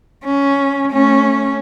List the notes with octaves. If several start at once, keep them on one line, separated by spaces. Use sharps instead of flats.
C#4
A3 C#4